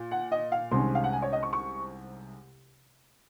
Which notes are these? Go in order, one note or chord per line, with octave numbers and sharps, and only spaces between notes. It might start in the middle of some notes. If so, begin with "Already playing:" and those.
Already playing: A#2
F#5
D#5
F5
C2 C3 D#3 G#3 C#4 C6
F5
F#5
G#5
C#5
D#5
C#6
C#6